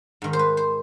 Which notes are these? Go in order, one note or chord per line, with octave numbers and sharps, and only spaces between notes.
G#2 D#3
C5
B4
C5